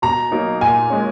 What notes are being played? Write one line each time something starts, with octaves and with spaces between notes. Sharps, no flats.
B2 A#5
F#3 A#3 D#4
A#2 G#5
G#3 C#4